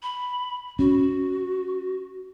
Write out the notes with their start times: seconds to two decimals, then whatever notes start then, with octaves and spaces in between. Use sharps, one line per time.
0.03 B5
0.79 C#4 F#4